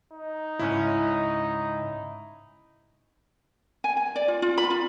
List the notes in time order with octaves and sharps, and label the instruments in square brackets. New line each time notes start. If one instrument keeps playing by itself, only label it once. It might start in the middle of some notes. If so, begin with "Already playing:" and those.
[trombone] D#4
[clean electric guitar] C#2 G#2 C#4 [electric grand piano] E4
[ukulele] G#5
G#5
D5
F4
F4
B5
F4